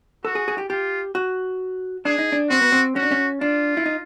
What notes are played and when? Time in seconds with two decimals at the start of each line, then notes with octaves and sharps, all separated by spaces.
0.25 F#4 A4
0.35 G#4
0.48 G#4
0.58 G4
0.70 F4 G4
1.15 F#4
2.05 D4 G#4
2.19 D#4
2.32 D4
2.50 C4 F#4
2.61 B3
2.72 C4
2.96 C#4 F#4
3.03 D4
3.12 C#4
3.41 D4 F4
3.77 E4
3.86 D#4